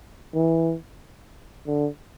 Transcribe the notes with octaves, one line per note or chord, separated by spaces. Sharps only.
E3
D3